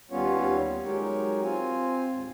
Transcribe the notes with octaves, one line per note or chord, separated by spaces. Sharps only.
D#2 G3 B3 C#4 F4 C#5
F#3 G#3 D#4 G4 A#4 C#5
C4 F4 G#5
D#2 G#2